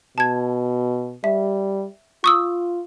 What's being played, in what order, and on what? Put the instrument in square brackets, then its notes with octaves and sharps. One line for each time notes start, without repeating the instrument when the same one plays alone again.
[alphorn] B2 [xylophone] A5 G#6
[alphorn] G3 [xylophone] E5
[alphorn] F4 [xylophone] C#6 D#6 E6